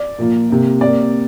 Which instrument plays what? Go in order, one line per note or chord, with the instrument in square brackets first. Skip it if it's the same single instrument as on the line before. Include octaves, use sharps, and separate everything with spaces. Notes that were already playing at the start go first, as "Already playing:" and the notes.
Already playing: [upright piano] D5
A#2 F3 A#3
C3 A#3
C3 A#3 D5